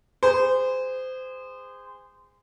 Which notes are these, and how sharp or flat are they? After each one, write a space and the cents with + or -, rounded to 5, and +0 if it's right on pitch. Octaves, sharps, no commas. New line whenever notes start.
G#4 -30 C5 -25